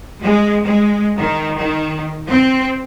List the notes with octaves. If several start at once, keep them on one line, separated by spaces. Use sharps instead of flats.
G#3
G#3
D#3
D#3
C4